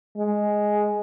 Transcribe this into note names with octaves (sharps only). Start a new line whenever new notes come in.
G#3